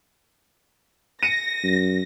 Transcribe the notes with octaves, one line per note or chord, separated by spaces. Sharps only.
A#6 C#7 D#7
F#2